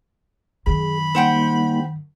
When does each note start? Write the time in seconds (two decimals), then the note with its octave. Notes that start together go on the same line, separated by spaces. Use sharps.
0.66 F#2 D#3 G#4 B5
1.15 G3 A#3 D#4 C5 F#5 G5